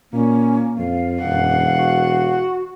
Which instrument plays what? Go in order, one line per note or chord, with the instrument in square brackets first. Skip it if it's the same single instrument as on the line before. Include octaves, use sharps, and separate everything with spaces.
[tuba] A#2 [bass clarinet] A#3 [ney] C#4
[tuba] F2 [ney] F5
[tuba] E1 [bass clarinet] F#2 [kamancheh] F#5
[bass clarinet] F#4